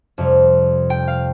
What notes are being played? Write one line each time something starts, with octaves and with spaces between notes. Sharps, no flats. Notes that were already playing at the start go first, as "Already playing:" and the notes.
F2 C3 G3
G5
F5